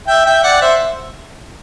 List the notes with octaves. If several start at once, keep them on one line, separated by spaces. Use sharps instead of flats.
E5 G5
E5 G5
D5 F#5
C5 E5